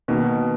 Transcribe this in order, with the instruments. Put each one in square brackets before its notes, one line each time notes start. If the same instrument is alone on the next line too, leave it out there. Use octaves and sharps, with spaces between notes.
[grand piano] B2 [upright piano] D#3 A#3 D#4 F#4